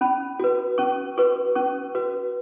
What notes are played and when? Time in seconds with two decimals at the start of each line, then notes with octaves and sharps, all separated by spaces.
0.01 C#4 B5
0.40 F#4 B4
0.78 C#4 C#6
1.17 F#4 B4 C#6
1.55 C#4 C#6
1.95 F#4 B4